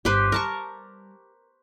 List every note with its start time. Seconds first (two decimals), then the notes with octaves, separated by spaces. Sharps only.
0.05 G1 G4 B4 C5
0.32 G3 A#4 A5 C#6